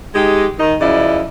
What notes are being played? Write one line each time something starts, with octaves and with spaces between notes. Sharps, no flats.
G#3 D#4 G4
D#3 D#4
F#2 C#3 F3 E4 D5 D#5